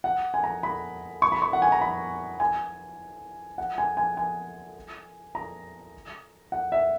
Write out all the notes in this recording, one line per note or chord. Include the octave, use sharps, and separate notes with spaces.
F#5
G#5
A#5
B5
C#6
B5
C#6
F#5
G#5
A#5
B5
G#5
F#5
G#5
G#5
G#5
A#5
F#5
E5